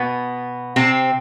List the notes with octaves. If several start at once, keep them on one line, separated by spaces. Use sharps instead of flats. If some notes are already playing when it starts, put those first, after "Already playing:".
Already playing: B2 B3
C3 C4